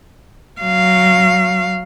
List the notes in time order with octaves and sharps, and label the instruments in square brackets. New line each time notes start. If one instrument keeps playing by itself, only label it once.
[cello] F#3 F5